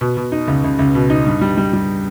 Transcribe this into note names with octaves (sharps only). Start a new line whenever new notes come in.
B2
B2
D#4
C#2
C#2
C#2
B2
D#4
G2
G3
G3
G3